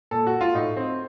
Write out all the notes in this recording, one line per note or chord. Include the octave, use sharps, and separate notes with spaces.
A#2 A4
F#4
F4
A2 D#4
C4